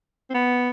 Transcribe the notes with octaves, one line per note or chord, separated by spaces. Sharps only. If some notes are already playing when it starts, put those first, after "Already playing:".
C4
B3